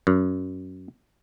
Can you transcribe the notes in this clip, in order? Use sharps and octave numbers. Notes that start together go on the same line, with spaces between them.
F#2